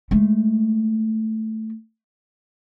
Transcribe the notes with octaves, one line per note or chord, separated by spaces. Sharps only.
G#3 A3